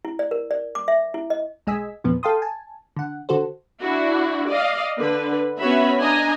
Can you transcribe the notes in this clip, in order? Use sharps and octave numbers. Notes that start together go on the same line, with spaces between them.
E4
D5
A#4
D5
D6
E5
E4
D#5
B1 G#3 D#5 G#5 E6 B6
E2 A#2 F3 B3
A4 F5 G5 A5 C6 D#6
G#5 A5
D3 F#5
D3 F#4 A4 C5
D4 E4 F#4
D5 D#5 F5
D3 B4
B3 C#4 F#4 C#5 E5 B5
D4 D#5 G#5 A#5